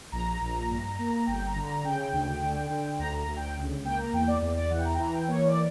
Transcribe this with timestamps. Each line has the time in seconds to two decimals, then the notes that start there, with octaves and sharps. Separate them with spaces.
0.12 A#1 A#5
0.41 A#1
0.69 G2
0.99 A#3
1.27 G1 G5
1.46 A#5
1.56 D3
1.65 A#5
1.84 C#3 G5
2.12 D2
2.41 D3
2.70 D3
2.99 D2 A#5
3.18 A#5
3.27 D2
3.36 G5
3.56 C#2
3.84 A#3 G5
3.99 A#5
4.13 E2 G5
4.28 D5
4.42 E2 D5
4.56 D5
4.70 E3 F#5
4.79 G5
4.85 A#5
4.94 G5
4.99 E3 A#5
5.13 G5
5.28 A#3 C#5
5.47 D5